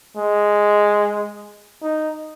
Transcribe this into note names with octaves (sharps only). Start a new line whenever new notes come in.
G#3
D#4